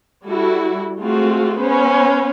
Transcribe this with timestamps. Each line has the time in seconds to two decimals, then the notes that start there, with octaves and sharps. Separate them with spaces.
0.24 G3 E4 F#4 A4
1.00 G#3 A3 C4 F4 F#4
1.57 B3 C#4 B4 C5